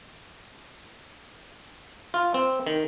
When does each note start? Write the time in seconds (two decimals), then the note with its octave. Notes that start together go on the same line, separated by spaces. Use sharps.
2.14 F4
2.34 C4
2.66 D#3